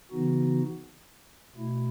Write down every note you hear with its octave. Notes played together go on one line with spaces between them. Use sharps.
C#3 E3 B3 D#4 F#4
B2 A3 E4